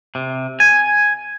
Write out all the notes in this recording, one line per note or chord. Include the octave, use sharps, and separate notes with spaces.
C3
G#5